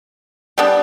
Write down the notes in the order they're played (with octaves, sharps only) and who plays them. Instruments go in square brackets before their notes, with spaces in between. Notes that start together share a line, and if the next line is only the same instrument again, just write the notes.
[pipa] G3 B3 D4